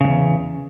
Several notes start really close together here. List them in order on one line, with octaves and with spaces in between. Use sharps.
C#3 G#2 E2